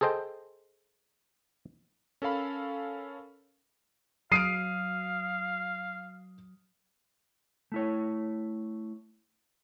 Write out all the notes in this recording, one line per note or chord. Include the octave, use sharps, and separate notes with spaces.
G#4 A4 C5 D#5 G5
C#4 A4 A#4 F5 B5
F#3 F5 D#6 F6 C7 D7 D#7
A3 E4 C#5